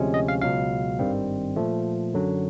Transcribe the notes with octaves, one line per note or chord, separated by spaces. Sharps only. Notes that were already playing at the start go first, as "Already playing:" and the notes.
Already playing: D2 C3 F3 G#3 C#4
D#5
F5
C#2 B2 F#3 F5
G#1 G2 D#3 G3 C4
A#2 F3 A3
F#2 D3 F#3